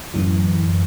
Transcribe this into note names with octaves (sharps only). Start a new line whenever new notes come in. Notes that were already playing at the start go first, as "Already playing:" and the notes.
F#2 A2 E3